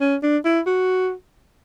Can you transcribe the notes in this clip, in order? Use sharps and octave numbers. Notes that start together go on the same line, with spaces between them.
C#4
D4
E4
F#4